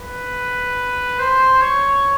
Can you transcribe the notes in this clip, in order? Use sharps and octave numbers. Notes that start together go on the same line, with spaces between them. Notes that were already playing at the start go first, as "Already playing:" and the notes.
Already playing: B4
C5
C#5